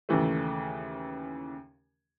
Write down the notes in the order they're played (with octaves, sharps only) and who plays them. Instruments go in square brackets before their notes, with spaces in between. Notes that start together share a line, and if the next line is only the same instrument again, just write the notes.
[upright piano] D#2 C#3 E3 A3